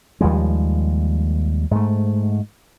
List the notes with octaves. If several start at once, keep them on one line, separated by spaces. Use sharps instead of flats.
D#2 F3 G3 G#3
G#2 A3